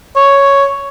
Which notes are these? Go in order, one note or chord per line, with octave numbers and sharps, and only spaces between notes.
C#5